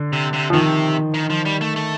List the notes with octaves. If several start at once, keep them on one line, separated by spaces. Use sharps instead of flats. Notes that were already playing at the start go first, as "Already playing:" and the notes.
Already playing: D3
C3
C3
F3
C3 D#3
D#3
F3
G3
A3
A3